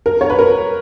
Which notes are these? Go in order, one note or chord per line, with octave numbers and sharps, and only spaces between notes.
A#4
C#5
B4
A#4